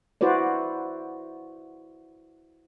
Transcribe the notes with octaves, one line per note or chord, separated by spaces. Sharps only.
E4 F#4 B4 C5 D5